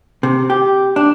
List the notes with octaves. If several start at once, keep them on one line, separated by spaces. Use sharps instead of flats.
C3
G4
D4